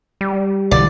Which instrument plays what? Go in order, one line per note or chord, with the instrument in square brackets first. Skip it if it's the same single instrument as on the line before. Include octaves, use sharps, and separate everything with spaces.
[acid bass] G3
[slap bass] B1 D3 E3 [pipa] D5